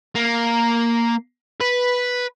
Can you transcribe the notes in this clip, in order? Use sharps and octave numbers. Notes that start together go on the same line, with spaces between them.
A#3
B4